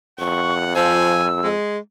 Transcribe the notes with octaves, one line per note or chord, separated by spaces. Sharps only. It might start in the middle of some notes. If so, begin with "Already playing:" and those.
F2 F#5 C#6
F3 G#5 E6
G#3 G#4